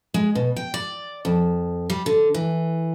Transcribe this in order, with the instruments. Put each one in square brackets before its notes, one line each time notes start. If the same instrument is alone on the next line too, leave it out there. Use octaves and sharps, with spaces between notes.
[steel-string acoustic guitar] G#3
B2
G5
D5
F2
G3
D3
E3